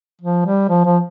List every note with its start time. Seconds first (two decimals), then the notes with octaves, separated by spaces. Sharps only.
0.21 F3
0.45 G3
0.69 F3
0.85 F3